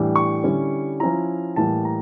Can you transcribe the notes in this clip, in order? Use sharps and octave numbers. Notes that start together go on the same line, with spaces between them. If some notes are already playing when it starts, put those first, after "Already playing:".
Already playing: A2 E3 G3 D4
C#6
D3 G3 C#4 E4
F3 C#4 E4 A#5
A2 E3 G3 A#3 A5
A#5